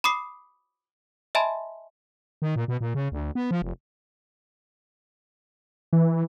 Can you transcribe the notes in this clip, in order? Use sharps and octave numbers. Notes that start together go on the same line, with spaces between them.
B5 D6 D#6 C7
D#5 E5 G#5 A5 B5 C6
D#3
A#2
B2
A#2
C#3
D2
B3
F3
F1
E3